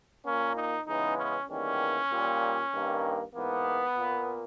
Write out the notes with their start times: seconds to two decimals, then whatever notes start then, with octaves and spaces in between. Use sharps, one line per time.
0.25 A#2 A#3 C#4
0.55 D#4
0.86 C#3 E3 G#3 B3 D#4
1.17 C#4
1.48 E2 D#3 G3 A#3 C#4
2.11 A#2 G3 A#3
2.73 G2 D#3 A#3
3.34 G#2 E3 A#3 B3
3.96 A#2 A#3